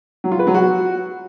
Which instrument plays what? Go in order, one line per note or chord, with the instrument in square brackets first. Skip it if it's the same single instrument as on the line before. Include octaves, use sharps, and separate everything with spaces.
[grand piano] F#3
F4
B4
F#3
F#4